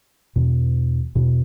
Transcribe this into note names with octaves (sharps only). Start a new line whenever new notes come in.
E2 B2
E2 B2